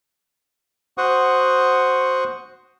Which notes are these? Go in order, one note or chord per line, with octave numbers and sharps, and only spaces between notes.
F#4 C5 F#5 C#6 D#6